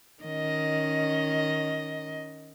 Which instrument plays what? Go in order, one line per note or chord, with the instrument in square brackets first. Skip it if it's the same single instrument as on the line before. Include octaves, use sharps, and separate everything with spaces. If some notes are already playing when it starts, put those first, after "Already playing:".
[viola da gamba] D#3 C#4 D#5